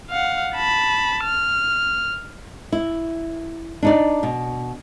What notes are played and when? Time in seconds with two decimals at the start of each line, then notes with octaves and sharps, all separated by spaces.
0.10 F5 F#5
0.55 A5 B5
1.24 F6
2.72 E4
3.83 D4 D#4 D5
4.23 B2